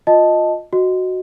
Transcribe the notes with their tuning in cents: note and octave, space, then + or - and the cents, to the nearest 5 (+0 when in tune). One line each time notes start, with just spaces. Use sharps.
F4 +15 D#5 +0 A5 +0
F#4 +0 D#5 +0